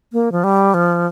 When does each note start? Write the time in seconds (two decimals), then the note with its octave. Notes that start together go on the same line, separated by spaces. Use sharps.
0.13 A#3
0.32 F3
0.44 G3
0.74 F3